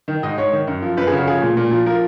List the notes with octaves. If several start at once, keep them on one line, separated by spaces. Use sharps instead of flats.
D#3
G#2 D#5
G#2 C#5
D#3
F#2
F3
F#2 B4
G#4
C#3
F#4
F3 G#4
A#2
A#2
F3
F3 A#4